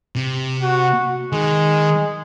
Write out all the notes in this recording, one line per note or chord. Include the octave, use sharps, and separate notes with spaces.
C3
F#4
D#3 G#3